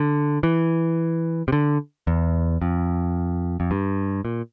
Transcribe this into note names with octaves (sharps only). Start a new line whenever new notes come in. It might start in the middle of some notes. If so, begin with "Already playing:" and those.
Already playing: D3
E3
C3
D3
E2
F2
F2
G2
A#2